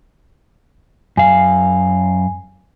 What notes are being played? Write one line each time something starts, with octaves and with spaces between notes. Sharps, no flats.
F#2 F5 G#5